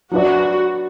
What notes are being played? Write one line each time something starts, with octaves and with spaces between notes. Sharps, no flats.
F#3 D4 F#4 B4 D5